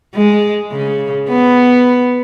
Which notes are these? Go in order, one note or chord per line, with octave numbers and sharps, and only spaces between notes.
G#3
C#3
B3